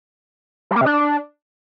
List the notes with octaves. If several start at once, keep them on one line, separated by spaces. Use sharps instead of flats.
G3
A#3
C3
D4